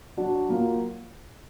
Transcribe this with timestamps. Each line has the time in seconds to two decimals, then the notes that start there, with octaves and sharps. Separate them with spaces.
0.17 F#3 D4 F#4
0.48 F#3 A#3 F4